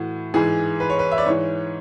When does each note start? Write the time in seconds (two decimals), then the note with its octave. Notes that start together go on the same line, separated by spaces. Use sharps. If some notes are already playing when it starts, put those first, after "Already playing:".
Already playing: A2 E3 F#4
0.34 G#2 E3 G#4
0.80 B4
0.90 C#5
0.99 B4
1.11 E5
1.18 D5
1.26 G#2 E3 C#5